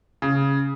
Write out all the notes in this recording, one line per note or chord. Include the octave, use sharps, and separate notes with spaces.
C#3